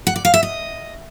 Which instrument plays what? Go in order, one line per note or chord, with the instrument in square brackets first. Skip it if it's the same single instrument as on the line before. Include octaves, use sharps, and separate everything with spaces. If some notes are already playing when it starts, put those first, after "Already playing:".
[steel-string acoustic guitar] F#5
D5
F5
E5
D#5